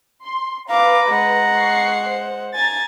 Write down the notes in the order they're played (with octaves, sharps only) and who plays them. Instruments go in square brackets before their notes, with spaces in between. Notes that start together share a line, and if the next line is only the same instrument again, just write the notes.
[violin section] C6
[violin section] B4 [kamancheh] F5 D6 [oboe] A#5
[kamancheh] G#3 F#5
[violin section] C#6 C7
C5
[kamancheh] G#5 [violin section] A#5 A6